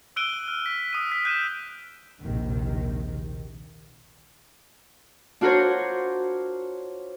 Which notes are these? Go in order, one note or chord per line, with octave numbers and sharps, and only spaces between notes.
E6 F#6 D7 D#7 G7
F6
B6
D#6 D#7
F6 B6
F#6 G6 D#7 E7
A#1 D#2 C3 D#3
D4 F4 F#4 A#4 C5 C#5